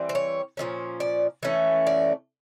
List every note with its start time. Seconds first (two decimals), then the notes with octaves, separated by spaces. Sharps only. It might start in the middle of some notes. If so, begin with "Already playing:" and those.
Already playing: E3 G3 C4
0.09 C5
0.15 C#5
0.57 A#2 F3 A3 C#4
1.00 D5
1.43 E3 A3 C#4
1.87 D5